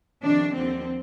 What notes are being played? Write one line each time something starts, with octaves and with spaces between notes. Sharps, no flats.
F2 C3 D#3 D4
D#2 D3 F3 C4